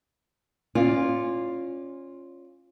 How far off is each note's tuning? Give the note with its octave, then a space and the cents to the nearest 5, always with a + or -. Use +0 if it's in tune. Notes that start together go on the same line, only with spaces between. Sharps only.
C#4 -20 F4 +0 D5 +10